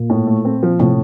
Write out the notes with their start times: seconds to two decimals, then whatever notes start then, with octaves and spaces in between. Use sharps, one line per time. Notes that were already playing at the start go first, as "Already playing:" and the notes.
Already playing: A#2 A#3
0.10 A2
0.27 A3
0.45 C4
0.63 F3
0.79 A2 C3 C4